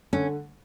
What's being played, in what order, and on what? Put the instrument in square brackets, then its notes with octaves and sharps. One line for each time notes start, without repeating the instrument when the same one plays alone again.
[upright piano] D3 [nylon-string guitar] C#4